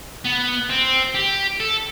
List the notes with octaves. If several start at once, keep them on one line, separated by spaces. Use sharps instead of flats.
B3
C4
G4
A4